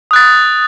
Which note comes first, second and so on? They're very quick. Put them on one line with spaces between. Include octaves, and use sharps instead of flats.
D#6 F#6 A6